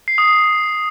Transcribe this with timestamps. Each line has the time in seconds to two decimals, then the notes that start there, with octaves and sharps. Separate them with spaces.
0.08 C7
0.18 D#6
0.29 D#6